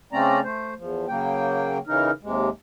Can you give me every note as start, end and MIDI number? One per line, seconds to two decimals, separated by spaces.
0.13 0.40 49
0.13 0.40 57
0.13 0.40 60
0.13 0.40 61
0.13 0.40 74
0.13 0.40 82
0.44 0.74 57
0.44 0.74 72
0.78 1.06 40
0.78 1.06 53
1.08 1.78 49
1.08 1.78 54
1.08 1.78 58
1.08 1.78 79
1.87 2.11 49
1.87 2.11 52
1.87 2.11 63
1.87 2.11 70
2.23 2.49 39
2.23 2.49 48
2.23 2.49 56